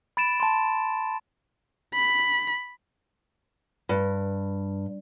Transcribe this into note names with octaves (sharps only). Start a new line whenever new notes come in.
B5 A6 D7 E7
A5 C6
B5
G2